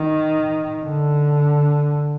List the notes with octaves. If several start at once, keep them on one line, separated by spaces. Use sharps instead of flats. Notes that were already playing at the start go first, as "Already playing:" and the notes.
Already playing: D#3
D3